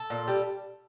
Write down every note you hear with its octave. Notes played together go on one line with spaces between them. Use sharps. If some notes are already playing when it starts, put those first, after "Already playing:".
Already playing: A4
A#2
G3